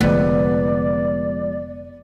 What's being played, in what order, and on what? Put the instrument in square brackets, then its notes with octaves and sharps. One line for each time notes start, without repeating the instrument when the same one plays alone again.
[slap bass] F1 D3 A3 [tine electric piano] F3 G#3 [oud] B3 [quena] D5